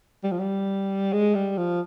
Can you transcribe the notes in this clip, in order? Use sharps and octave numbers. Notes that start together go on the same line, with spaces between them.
G3
F3
G3
G#3
G3
F3